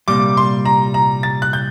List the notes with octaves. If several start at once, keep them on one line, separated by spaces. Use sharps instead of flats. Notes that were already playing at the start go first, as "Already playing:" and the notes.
C2 A#2 G3 D6
C6
A#5
A#5
A6
F#6
G6